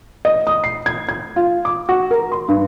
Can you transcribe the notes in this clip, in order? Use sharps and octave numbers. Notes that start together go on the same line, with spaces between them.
D#5
D#6
C7
G#6
G#6
F4
D6
F#4
A#4
C6
G2